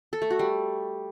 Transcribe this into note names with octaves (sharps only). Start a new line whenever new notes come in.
A4
A3
F#4
G3